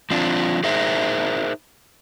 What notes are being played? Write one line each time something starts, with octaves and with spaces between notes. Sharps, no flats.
F3 C4 D4 F4
D#4 G#4 A#4 C5 E5